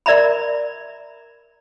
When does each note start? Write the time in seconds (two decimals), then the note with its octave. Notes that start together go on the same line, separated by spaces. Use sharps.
0.06 A#4 D5 E5 A#5 B5